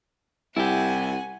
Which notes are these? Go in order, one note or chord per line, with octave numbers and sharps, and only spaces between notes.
C2 E4 G4 F#5 G#5